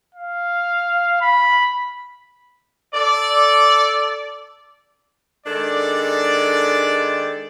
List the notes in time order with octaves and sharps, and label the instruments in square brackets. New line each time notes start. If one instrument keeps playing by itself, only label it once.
[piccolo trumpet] F5
B5
[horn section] A4 D5
D#3 G#3 D4 A4 D5